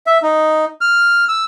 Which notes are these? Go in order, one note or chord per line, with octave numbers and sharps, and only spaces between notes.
E5
D#4
F6
E6